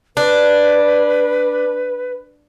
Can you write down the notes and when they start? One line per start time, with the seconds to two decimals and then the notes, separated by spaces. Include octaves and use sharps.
0.17 D4 B4